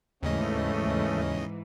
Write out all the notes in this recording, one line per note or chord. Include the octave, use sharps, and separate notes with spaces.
D#2 G#2 C#3 E3 A3 C#4 D#5